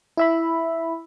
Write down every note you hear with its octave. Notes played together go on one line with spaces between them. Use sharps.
E4 E5 B5